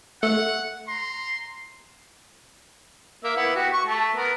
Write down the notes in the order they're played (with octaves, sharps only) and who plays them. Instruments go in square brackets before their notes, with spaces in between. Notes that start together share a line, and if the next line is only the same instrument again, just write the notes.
[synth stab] A3 [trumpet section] F#5
[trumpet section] A#5 C6
[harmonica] A#3 E5
B3 E4 F#5
F#4 G4
C#6
A3
B3 A#4